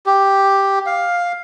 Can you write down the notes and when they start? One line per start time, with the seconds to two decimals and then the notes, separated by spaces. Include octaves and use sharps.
0.06 G4
0.86 F5